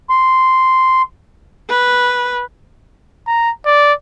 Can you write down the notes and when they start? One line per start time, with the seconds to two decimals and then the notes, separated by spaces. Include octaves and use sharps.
0.10 C6
1.69 B4
3.27 A#5
3.66 D5